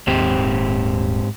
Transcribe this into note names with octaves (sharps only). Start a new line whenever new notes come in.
D#1 G#2 C4 G4